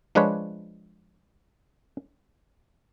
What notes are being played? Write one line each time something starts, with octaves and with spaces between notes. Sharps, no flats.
F3 G#3 D4 F4 B4 C#5